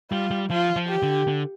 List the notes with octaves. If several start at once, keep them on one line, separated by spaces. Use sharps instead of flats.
G3 F4
G3
F3 F4
F3
G4
D3
D3